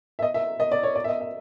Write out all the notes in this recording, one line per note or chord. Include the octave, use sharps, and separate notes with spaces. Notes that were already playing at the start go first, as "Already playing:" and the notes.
E5
D#5
E5
D#5
D5
C#5
D5
E5
D#5
E5